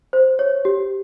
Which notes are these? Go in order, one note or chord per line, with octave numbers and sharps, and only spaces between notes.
C5
C#5
G4